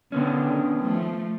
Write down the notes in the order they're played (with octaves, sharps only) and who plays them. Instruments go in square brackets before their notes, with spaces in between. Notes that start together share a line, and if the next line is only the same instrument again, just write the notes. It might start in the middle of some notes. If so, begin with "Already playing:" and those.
[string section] D3 [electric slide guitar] D#3 B3 C#4
[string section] F3 A3